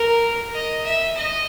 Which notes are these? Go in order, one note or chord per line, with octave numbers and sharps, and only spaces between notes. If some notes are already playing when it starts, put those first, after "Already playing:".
Already playing: A#4
D#5
E5
D#5